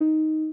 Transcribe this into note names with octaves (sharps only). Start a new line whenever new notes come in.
D#4